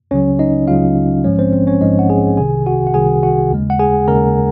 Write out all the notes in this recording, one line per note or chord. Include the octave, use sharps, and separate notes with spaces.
C#2 C#3 F#3 C#4 C#5
D#4 D#5
C#2 C#3 F#3 F4 F5
A#1 G#2 F3 G#3 C#4 C#5
C4 C5
C4 C5
C#4 C#5
A#1 G#2 F3 G#3 D#4 D#5
F#5
G#4 G#5
C2 C3 D#3 G#4 G#5
F#4 F#5
F#5
C2 C3 D#3 G#4 G#5
F#4 F#5
D#2 C#3 G#3
F#5
G#4 G#5
D#2 C#3 G#3 A#4 A#5